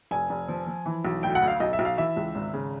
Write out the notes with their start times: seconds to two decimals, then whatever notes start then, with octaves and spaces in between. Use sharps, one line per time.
0.11 F1 G#5
0.30 F1
0.48 F3
0.67 F3
0.86 E3
1.05 B1
1.23 D2 G5
1.35 F#5
1.42 D2
1.48 F5
1.60 B1 D#5
1.73 E5
1.79 B1
1.85 F5
1.97 E3 E5
2.17 C#2
2.35 G#1
2.54 C#3